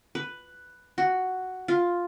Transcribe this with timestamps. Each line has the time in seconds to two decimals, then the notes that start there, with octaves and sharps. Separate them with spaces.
0.15 B4
0.98 F#4
1.68 F4